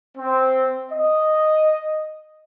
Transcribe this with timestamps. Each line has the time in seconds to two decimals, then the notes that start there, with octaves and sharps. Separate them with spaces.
0.17 C4
0.92 D#5